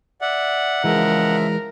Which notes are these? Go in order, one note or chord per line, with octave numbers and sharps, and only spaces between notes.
D5 E5 F#5
C#3 E3 F3 G#3 A#4 E5